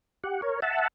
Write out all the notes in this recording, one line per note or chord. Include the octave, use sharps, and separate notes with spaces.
G4 F#5
A#4 C#5
E5 F#5 A5